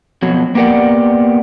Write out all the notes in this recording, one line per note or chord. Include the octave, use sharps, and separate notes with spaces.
F2 B2 F#3
A#3 B3 G4 A#4 D5 F#5